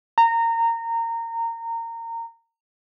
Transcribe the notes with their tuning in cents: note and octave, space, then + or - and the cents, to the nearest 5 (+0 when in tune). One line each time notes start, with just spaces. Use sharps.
A#5 -20